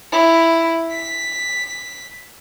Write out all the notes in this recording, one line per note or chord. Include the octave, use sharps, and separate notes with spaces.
E4
B6